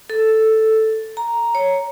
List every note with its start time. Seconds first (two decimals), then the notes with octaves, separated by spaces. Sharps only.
0.10 A4
1.17 A#5
1.55 C#5